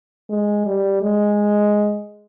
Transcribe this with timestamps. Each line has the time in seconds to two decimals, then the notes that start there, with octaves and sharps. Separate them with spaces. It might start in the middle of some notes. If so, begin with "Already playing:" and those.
0.30 G#3
0.66 G3
1.02 G#3